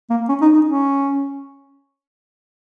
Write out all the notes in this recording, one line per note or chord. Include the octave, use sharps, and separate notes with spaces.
A#3
C#4
D#4
D#4
C#4